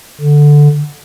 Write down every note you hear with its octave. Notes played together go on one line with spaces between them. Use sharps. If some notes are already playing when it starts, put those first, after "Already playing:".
D3